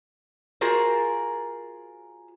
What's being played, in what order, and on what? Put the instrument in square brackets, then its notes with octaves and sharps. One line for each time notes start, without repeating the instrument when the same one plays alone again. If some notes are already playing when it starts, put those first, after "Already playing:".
[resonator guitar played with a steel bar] F4 F#4 G#4 A#4 C5